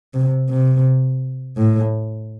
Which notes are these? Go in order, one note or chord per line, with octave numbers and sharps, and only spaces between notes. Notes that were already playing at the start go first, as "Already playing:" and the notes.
C3
C3
A2